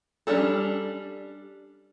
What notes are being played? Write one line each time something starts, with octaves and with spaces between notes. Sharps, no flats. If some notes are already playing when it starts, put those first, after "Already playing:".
G3 C#4 D4 G#4 A4